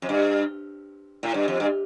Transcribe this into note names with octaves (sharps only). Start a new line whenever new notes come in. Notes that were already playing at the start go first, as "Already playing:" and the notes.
F2
G2
A2
G2
F2
G2